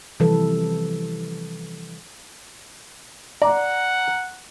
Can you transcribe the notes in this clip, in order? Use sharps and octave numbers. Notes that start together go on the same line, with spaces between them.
C3 E3 F3 G3 A4 B4
D5 F#5 A#5